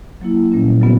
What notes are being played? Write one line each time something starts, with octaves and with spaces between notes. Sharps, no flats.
F#3 A#3 E4
A#2 G3 C#4
C#3 F#3 B3 F#4